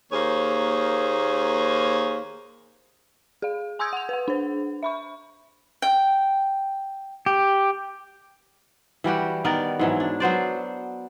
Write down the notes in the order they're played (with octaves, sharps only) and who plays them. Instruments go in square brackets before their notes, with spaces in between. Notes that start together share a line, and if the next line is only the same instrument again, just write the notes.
[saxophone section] D#2 A#3 G#4 C5 C#5
[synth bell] G#4 F5
G#5 C6 D#6 E6 G6 G#6
F#5 F7
B4 F#5
D4 C5
E5 B5 C#6
[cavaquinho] G5
[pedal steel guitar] G4
[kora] E3 G3 F#4 G4
D#3 B3 A#4 D5
G#2 E3 F#3
D4
F#3 B3 C5 D5